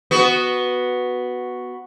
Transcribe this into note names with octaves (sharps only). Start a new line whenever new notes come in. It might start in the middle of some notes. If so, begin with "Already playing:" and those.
B3 F#4